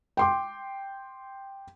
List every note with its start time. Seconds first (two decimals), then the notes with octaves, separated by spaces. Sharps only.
0.17 G5 C6 D6